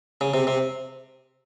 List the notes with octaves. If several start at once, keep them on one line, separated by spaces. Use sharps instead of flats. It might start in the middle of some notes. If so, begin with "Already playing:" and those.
C#3
C3
C3